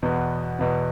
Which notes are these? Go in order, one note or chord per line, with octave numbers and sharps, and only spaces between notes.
E2 B2 B3
E2 B2 B3